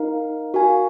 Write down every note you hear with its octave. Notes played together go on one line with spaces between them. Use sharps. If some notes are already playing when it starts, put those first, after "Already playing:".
Already playing: D#4 A#4 F5
F#4 A#4 F5 G#5